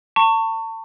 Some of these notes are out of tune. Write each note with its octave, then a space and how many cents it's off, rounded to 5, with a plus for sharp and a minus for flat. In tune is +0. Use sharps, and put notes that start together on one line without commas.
A5 +35 C#6 +0